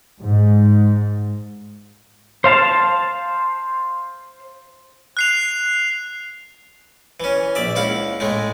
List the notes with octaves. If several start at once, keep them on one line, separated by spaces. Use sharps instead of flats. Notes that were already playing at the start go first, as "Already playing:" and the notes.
G#2
C5 F5 A5
F#6 C7 F7
E3 C#4
A#1 D5 E5
C#2 E4 F5 F#5
A2 G#3 A3